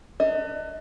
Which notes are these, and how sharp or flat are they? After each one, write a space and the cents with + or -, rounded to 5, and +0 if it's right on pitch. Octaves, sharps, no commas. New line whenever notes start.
D4 +40 D#5 +35